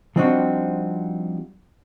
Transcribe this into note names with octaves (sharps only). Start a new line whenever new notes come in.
F3 G3 C4 D4 D#4 F#4